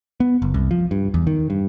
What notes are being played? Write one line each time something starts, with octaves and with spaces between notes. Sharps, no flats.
B3
F#1
C2
F3
G2
E2
D#3
G2